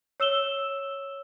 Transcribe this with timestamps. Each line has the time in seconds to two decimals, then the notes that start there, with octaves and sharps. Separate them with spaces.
0.20 C#5 E6 E7 G7